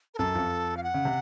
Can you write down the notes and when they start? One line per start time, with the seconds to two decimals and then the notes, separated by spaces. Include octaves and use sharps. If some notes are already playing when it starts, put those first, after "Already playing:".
0.14 A#4
0.18 F#2 A4
0.35 F2
0.77 F5
0.83 F#5
0.94 C#3
1.05 C3